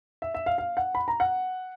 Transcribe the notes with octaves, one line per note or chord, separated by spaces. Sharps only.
E5
E5
F5
F5
F#5
B5
A#5
F#5